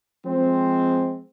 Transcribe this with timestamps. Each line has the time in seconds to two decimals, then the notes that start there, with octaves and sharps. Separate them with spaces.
0.24 F3 G#3 C4